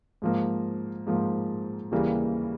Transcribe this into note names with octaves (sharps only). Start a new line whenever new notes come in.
G#2 F3 A#3
G#2 F3 A#3
D#2 C#3 E3 G3 A#3